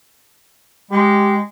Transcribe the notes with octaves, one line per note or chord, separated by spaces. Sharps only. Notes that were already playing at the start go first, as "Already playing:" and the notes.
G#3 G4